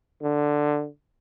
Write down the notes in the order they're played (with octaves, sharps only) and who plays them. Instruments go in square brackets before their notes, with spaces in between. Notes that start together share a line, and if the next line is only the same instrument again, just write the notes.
[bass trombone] D3